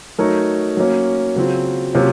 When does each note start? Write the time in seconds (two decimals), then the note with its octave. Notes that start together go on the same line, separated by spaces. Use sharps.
0.18 F#3 A3 D#4 A#4 C#5
0.77 F#3 A#3 C#4
1.36 C#3 F#3 C4 F4
1.94 C3 F#3 A#3 C#4 F4